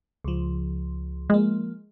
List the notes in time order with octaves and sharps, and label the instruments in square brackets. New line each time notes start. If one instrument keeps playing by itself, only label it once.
[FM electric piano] C#2 F3
[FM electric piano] F3 A#3 [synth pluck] G#3